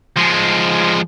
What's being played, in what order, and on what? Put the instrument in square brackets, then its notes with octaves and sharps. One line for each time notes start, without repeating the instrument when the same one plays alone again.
[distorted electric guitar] F3 G#3